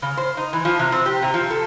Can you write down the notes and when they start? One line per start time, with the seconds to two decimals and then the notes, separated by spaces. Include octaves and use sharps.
0.02 C#3
0.17 C5
0.37 D#4
0.53 E3
0.65 F3
0.79 C3
0.92 C4
1.06 G4
1.22 C3
1.34 F3
1.51 A4